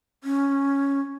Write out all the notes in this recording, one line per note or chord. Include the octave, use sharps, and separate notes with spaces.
C#4